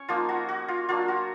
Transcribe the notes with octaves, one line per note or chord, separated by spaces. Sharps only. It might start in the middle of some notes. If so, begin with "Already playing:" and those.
Already playing: C#4 C#5
F3 A#3 D#4 F4
F#4
F#4
F4
F#3 A#3 D4 F4
F#4